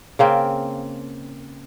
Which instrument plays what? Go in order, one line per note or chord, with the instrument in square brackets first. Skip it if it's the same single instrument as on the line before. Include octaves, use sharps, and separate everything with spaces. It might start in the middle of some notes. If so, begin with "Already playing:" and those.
[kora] C#3 A#3 C4